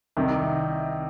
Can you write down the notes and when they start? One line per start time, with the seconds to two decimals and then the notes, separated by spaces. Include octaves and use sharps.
0.17 C2 C3 D#3